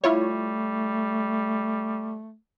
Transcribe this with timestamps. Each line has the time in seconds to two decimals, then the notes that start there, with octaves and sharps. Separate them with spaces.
0.04 G3 A3 E4 F4 C#5